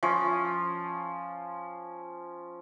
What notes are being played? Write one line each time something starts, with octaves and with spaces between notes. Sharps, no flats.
F3 C#4